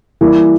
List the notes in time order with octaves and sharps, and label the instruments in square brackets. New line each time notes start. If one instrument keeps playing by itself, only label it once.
[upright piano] E3 G3 A#3 E4 G4